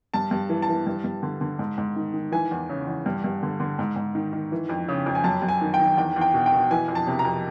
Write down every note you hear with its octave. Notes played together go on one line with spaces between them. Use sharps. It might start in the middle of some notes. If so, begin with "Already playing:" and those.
G2 A5
G2
E3
A5
E3
G2
G2
D3
D3
G#2
G#2
D#3
D#3
E3 G#5
E2
C#3
E2
G2
G2
D3
D3
G#2
G#2
D#3
D#3
E3
F2
C#3
F2
G#5
F#2 A5
F#2
G#5
D#3
G5
D#3
E2 G5
E2
G5
B2
G5
B2
E3 G#5
F2
A5
C3
A#5
F2